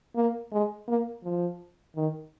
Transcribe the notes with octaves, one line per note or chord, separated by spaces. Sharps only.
A#3
G#3
A#3
F3
D#3